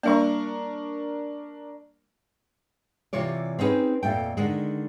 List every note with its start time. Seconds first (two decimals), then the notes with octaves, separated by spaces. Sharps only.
0.03 G3 A#3 D4 A#4 C#6
3.13 C3 E3 F4 C#5 D5
3.59 C4 C#4 D#4 G#4 B4
4.03 F2 A#2 A3 G5
4.37 D3 D#3 G#3